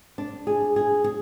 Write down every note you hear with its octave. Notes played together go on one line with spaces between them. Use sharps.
D4
G#4
G#4
G#4